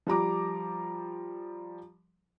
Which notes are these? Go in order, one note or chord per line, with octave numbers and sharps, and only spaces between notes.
F3 G3 A#5 D6